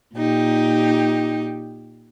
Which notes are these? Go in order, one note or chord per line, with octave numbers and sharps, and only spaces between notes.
A#2 D#4 G4